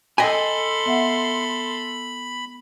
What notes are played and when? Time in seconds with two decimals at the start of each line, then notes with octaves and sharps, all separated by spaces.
0.18 A4 D#5 G5 G#5 B5 C6
0.86 B3 E5 F#5